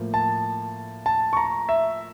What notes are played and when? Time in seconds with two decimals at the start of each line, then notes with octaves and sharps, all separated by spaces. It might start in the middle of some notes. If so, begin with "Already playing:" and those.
Already playing: A2 F3 A#3
0.14 A5
1.06 A5
1.33 C#6
1.37 A#5
1.69 E5